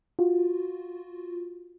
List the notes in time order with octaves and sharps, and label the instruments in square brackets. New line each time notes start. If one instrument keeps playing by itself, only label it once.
[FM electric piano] F4 F#4